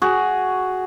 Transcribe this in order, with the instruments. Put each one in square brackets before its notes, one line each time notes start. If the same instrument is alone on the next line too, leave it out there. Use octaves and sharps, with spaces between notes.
[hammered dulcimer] F#4 G#4